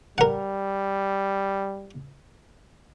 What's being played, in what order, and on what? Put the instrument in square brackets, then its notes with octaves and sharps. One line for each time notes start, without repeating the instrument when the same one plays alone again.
[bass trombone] G3 [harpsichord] A#4 F#5